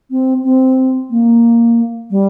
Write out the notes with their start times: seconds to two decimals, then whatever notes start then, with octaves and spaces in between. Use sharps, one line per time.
0.11 C4
0.44 C4
1.10 A#3
2.11 G3